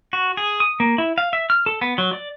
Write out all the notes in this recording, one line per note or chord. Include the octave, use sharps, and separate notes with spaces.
F#4
G#4
D#6
A#3
E4
F5
E5
F6
A4
B3
F#3
D5